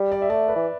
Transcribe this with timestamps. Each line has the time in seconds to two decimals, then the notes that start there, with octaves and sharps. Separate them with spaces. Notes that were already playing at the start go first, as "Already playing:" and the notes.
Already playing: G3
0.12 D5
0.22 E5
0.29 A3 D5
0.48 B4
0.56 E3